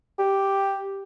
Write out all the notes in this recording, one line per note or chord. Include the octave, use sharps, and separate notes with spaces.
G4